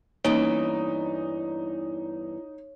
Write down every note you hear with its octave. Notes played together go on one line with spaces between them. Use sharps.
E2 G2 E3 A#3 C#4 D#4 C#5